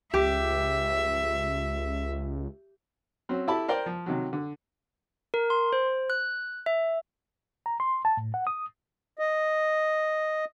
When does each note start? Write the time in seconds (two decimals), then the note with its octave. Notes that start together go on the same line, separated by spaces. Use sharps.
0.14 C#2 G4 E5
3.29 F#3 C4 C#4
3.48 E4 G4 A4 E5 A5 B5
3.68 A#4 C5 D5 G5
3.86 F3
4.06 C3 D#3 F#3
4.33 D3
5.34 A#4
5.50 C6
5.73 C5
6.10 F#6
6.66 E5
7.66 A#5
7.80 C6
8.05 A5
8.17 A2
8.34 F#5
8.47 D#6
9.19 D#5